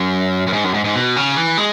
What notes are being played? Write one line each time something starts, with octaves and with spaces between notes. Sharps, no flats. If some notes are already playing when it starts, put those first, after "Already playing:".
Already playing: F#2
F#2
G#2
F#2
G#2
G#2
B2
C#3
E3
G#3